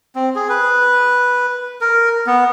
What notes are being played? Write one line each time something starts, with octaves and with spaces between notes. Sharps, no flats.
C4
G#4
B4
A#4
B3